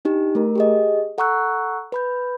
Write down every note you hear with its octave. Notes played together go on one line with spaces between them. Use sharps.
D4 D#4 G4
A3 A#4
G4 G#4 D#5
A4 F#5 A#5 C#6 E6 F#6
B4 B5 G6